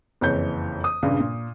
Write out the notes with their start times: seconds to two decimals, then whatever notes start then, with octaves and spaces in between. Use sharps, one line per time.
0.21 F#1 F2 E3 C#5 G6
0.84 D#6
1.03 A#1 G2 A#2 C#3
1.20 A#2